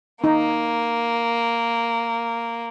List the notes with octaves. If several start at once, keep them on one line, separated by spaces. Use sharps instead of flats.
A#3 D#4